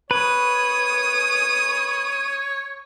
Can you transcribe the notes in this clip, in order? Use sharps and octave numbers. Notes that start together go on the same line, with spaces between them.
B4 C#5 D#6